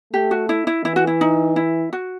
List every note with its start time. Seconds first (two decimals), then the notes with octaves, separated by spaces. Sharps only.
0.13 A3 G4
0.31 F#4
0.49 E4
0.67 E4
0.85 E3 E4
0.96 F#4
1.07 E4
1.21 D#4
1.56 E4
1.93 F#4